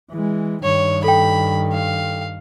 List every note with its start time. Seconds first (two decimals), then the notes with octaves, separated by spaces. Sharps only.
0.11 E3 G#3
0.64 G2 D#3 C#5
1.04 A4 G5 B5
1.73 F5